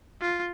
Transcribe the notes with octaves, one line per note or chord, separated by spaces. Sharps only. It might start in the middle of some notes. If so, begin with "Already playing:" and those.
F4